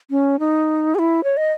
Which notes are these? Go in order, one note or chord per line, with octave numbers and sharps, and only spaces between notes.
C#4
D#4
G#4
E4
C#5
D#5